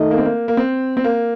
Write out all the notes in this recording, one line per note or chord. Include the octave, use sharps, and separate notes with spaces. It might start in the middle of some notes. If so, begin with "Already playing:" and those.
Already playing: D#3 A3 D#4 A4 D#5
A#3
C4
A#3
A#3
C4
C4
A#3